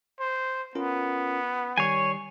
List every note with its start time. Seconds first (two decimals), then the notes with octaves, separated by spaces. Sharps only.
0.20 C5
0.75 B3 C#4 F4 A#4
1.78 D#3 G3 C#5 G#5 C7